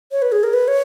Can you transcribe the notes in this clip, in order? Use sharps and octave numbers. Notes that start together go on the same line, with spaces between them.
C#5
B4
G#4
A#4
B4
C#5